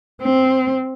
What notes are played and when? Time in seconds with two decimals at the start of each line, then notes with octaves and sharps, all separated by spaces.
0.21 C4